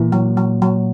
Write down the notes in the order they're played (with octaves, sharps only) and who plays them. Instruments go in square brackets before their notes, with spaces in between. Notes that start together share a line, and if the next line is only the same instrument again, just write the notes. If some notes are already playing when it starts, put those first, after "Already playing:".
Already playing: [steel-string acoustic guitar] A#2 [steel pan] E3
[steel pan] F#3
F#3
F#3